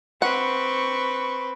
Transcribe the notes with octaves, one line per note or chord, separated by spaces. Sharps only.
C4 B4 F#5 C#6